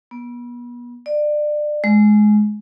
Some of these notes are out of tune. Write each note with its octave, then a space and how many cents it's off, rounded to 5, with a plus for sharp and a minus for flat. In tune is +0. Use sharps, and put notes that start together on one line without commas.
B3 -35
D5 +25
G#3 +20